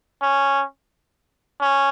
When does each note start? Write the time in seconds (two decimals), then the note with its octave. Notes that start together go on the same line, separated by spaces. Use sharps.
0.22 C#4
1.61 C#4